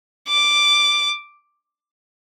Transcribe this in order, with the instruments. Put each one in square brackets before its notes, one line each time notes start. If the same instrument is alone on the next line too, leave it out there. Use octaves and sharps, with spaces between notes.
[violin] D6